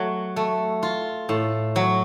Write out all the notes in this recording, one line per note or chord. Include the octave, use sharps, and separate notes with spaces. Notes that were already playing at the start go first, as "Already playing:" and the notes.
Already playing: F#3 A3
A3
F4
A2
F#3